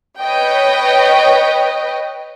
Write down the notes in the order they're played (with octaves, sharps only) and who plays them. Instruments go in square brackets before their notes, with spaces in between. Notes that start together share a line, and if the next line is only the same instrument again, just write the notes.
[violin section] B4 C#5 D#5 G5